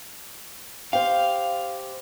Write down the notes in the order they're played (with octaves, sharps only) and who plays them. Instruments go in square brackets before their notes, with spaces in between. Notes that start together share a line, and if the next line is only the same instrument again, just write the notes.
[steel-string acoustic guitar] G4 C5 [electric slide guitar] F5